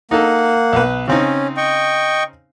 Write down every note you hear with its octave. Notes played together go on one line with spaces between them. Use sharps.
A#3 D#4 A4 F#5
B1 B4
C#3 C4 C#4 D#4
D#5 G5 C#6